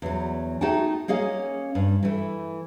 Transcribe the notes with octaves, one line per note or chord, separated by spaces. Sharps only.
E2 F#3
A3 D#4 F#4 G#4 G5 A5
A#3 C#4 G#4 D#5 F5
G2
E3 A3